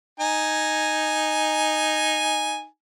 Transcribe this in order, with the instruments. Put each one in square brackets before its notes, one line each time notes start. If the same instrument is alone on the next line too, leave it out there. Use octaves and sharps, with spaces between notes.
[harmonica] D#4 G#5